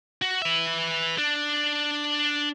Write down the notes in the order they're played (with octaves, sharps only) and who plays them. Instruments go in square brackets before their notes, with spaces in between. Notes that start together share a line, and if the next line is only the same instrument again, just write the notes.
[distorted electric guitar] F#4
B4 E5
D4